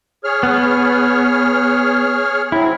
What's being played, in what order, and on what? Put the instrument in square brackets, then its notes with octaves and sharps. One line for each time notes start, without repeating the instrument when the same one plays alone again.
[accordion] G#4 C#5 F6
[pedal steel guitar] B3
[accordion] F#3 C4 [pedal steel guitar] E4